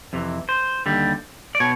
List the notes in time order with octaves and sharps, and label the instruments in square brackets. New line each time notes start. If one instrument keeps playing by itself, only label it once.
[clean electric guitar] F2 C3 E3
C5
D#2 D3 G3
D5
B2 C#5